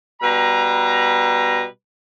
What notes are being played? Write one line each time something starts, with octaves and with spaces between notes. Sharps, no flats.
B2 G3 B4 A#5